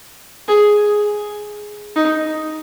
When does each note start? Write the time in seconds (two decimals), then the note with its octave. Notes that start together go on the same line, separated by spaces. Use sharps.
0.48 G#4
1.96 D#4